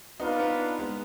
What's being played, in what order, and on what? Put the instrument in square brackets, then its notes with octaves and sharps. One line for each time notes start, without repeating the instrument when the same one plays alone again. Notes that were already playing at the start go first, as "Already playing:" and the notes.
[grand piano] B3 D#4 [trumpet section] D4 F4 B4 F5
[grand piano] B3 D#4
G#3 B3